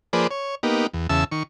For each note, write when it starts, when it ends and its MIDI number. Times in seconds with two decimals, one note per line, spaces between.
0.13 0.27 53
0.13 0.27 58
0.13 0.27 68
0.13 0.27 71
0.13 0.27 72
0.13 0.27 74
0.31 0.55 73
0.63 0.87 58
0.63 0.87 59
0.63 0.87 63
0.63 0.87 67
0.94 1.07 40
1.09 1.24 40
1.09 1.24 49
1.09 1.24 76
1.09 1.24 81
1.09 1.24 88
1.32 1.43 51
1.32 1.43 85